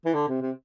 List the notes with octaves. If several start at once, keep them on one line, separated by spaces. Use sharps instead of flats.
E3
D3
C3
C3